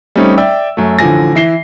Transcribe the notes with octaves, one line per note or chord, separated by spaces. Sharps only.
G3 A3 C4 C#4 D#4
D5 E5 G5 E6
F#2 A3
A1 D3 F3 G#5 A#6
E3 E5 C7 G7